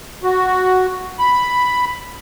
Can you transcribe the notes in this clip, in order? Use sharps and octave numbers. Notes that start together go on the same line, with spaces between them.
F#4
B5